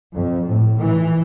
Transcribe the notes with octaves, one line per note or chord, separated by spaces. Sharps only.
F2
A2
E3